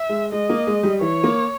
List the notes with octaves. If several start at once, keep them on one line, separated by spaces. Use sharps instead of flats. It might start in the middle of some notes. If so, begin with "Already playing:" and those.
Already playing: E5
G#3
G#3 D#5
A#3
G#3
G3
E3 C#5
A#3